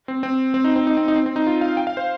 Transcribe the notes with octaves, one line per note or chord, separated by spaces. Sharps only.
C4
C4
C4
D#4
C4
D#4
C4
D#4
C4
C4
D#4
F4
F5
G5
F5
C5